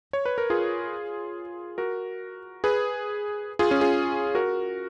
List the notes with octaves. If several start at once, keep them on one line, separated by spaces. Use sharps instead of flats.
C#5
B4
A#4
F4 G#4
F#4 A#4
G#4 B4
F4 G#4
C#4 F4
F4 G#4
F#4 A#4